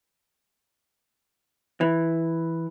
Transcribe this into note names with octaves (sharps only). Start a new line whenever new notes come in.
E3